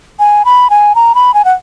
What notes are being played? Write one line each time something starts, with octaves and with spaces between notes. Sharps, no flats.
G#5
B5
G#5
A#5
B5
G#5
F#5